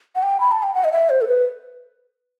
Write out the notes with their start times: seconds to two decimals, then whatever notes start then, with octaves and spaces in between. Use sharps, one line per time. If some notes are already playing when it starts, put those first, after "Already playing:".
0.15 F#5
0.23 G5
0.40 B5
0.52 A5
0.63 G5
0.74 F#5
0.84 D#5
0.92 E5
1.10 C5
1.21 A4
1.28 B4